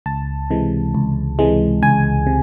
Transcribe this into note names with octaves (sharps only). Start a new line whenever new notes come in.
C#2 A5
C3 E3 G#3
C#2
C3 E3 G#3
C#2 G#5
C3